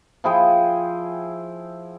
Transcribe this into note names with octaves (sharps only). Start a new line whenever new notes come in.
F3 E4 G#4 G5